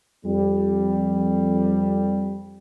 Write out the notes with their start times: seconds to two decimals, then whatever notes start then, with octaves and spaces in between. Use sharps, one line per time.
0.25 F2 G3